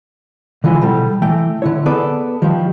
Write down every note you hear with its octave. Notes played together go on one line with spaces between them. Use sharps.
D3 E3 F3 G#3
B2 G3 A4
E3 A3 G5
D3 E4 C#5
B3 G#4 A4 B4 D5
D#3 F3 G3